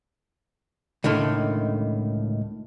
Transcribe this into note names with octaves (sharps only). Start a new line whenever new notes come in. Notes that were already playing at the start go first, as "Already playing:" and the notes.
C#2 A2 D3 D#3